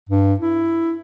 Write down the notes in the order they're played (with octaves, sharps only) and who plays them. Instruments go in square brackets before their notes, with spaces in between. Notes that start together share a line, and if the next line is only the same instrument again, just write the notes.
[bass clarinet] G2
E4